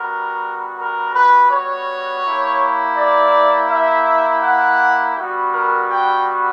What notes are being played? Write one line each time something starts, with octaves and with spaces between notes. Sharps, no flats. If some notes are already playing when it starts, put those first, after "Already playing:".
Already playing: G3 B3 F#4 A#4
A#4
B4
C#5
A#3 E4 G4
D5
E5
F#5
G3 B3 F#4
A#4
G5